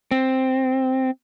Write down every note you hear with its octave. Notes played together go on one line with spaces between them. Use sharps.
C4